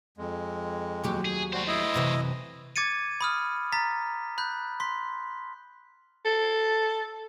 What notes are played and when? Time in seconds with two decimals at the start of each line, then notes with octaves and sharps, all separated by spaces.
0.18 F2 G#3
1.04 D#2 F#3 G4
1.25 G#4
1.53 G3 A3 F#4 C5
1.67 E4 D#5
1.94 F#2 C3 E3
2.76 D6 G#6 A6 C#7 D#7
3.21 B5 D#6 F6
3.72 A#5 A6 B6
4.38 B5 F#6 G6
4.80 C6 B6
6.25 A4